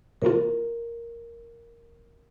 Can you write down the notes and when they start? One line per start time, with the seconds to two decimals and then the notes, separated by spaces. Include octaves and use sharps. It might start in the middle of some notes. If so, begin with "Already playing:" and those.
0.22 C3 E3 A#3 F4 A#4